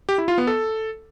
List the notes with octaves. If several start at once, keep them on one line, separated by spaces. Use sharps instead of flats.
G4
E4
F4
B3
A4